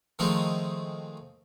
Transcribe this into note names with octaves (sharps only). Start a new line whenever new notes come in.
D#3 F3 G#3 A3 C4 D#4